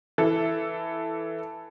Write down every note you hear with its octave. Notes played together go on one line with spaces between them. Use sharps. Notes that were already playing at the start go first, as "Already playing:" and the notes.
E3 A4